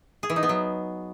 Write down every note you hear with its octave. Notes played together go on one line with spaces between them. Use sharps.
G#4
E3
D#4
B3
F#3